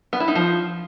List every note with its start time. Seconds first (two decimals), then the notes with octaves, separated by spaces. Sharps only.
0.13 B3
0.20 E4
0.28 D#4
0.35 F3